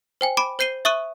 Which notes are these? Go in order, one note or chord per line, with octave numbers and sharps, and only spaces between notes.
C5 G5 G#5
B5 D6 D7
C5 G6 C7 D#7 G7
E5 C#6 D#6 F#6 D#7